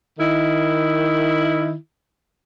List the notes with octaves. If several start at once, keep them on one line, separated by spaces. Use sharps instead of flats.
D#3 E4